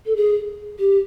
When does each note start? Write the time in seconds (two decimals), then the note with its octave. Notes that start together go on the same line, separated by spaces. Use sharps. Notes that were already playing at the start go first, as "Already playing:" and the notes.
0.06 A4
0.16 G#4
0.79 G4